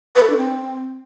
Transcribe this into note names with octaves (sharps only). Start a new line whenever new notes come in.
B4
A4
D4
C4